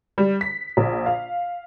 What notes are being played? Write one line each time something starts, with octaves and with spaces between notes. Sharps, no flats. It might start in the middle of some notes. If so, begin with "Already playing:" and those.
G3
B6
A#1
F5